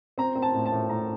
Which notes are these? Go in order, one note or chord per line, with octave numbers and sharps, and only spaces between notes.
C4 A#5
C4
A5
A2
A5
A2
A2 A#5